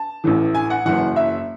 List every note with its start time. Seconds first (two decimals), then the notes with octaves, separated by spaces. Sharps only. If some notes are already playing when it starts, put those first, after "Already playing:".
Already playing: A5
0.24 A1 A2 E3
0.55 G#5
0.70 F#5
0.85 F#1 F#2 E3 F#5
1.16 E5